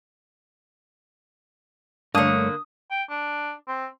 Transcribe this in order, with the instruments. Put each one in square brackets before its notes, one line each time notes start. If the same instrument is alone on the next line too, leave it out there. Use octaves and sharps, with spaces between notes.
[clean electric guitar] G2 A3 C#5 [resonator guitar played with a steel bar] D3 A#3 [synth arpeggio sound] D4 [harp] D#6
[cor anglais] G5
D4
C4